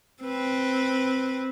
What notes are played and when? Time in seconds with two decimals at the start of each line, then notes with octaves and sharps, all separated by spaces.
0.23 C4 B4